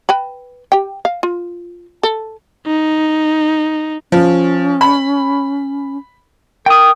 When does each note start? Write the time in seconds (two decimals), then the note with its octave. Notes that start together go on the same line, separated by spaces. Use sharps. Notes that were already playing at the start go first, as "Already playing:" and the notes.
0.09 B4 G5 B5
0.72 G4 G5
1.05 F5
1.23 F4
2.03 A4
2.67 D#4
4.12 F3 C#4
4.81 B5
6.66 A#4 G5 D#6